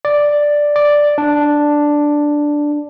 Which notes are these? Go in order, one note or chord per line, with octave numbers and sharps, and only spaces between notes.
D5
D5
D4